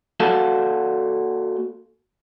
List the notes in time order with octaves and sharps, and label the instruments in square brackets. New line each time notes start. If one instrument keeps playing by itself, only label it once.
[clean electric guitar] A#3 F#4 A4 F5 F#5 A5